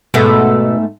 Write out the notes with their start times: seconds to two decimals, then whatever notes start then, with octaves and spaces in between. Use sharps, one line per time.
0.14 G#2 B2 A3 B3